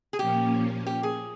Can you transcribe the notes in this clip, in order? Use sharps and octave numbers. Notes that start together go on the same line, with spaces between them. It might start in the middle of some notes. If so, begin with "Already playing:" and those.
G#4
A#2 F3 A#3 C#4 G4
G4
G#4